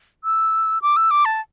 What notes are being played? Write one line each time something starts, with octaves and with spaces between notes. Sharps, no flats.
E6
D6
E6
D6
A5